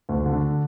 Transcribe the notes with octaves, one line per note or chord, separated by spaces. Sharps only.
D2
D3